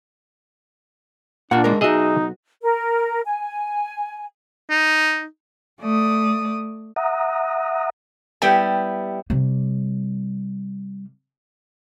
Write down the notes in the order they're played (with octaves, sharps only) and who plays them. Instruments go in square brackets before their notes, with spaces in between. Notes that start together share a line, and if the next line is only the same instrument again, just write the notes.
[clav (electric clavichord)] A#2 [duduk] D4 [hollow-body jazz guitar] F4 F#5
[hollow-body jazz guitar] G#3 A#4
[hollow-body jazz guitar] B1 F#4 [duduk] D#4 [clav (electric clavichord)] G#4 D#5 E5
[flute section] A#4
G#5
[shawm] D#4
[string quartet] A3 D5 D#6
[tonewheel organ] E5 F#5 A#5 D#6
[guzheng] G3 B3 E4 [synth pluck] G5
[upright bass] C3 G3